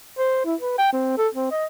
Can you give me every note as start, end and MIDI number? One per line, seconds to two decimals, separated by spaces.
0.18 0.42 72
0.45 0.55 64
0.60 0.75 71
0.78 0.91 79
0.93 1.14 60
1.18 1.28 69
1.34 1.50 60
1.51 1.65 75